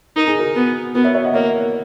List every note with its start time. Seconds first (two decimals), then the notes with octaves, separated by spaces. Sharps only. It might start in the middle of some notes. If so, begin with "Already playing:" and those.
0.16 D#4 A#4
0.27 G#4
0.39 F#4 A#4
0.55 B3
0.95 B3 F#4 A#4
1.04 C#5 E5
1.14 C#5 E5
1.24 D#5 F#5
1.34 A#3 C#5 E5